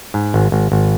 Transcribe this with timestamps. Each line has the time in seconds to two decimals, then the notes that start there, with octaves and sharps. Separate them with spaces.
0.14 G#2
0.34 G#1
0.52 G#1
0.72 G#1